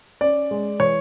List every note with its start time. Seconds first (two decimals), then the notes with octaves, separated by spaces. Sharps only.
0.21 C#4 D5
0.51 G#3
0.80 E3 C#5